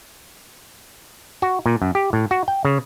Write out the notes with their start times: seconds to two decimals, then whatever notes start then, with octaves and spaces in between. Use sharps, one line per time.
1.42 F#4
1.66 A#2
1.82 F#2
1.95 G4
2.13 A2
2.31 F#4
2.48 G5
2.65 C#3